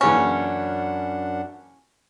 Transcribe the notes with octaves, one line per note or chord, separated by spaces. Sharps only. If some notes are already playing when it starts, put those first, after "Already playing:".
F#2 A#2 C#3 E3 C#4 D4 F#5